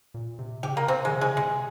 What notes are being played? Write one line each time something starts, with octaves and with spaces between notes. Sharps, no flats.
A#2
C3
C#3 G4
A#3
C3 C4
D#3 G#3
C#3
G#3
C3 G#3